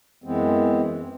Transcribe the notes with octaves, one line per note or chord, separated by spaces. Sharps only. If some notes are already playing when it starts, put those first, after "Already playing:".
F#2 E3 G#3 B3 C4